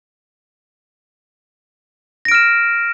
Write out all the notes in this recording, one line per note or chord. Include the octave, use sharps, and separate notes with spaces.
F6 A#6 D7 E7